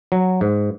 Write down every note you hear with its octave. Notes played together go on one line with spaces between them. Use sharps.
F#3
G#2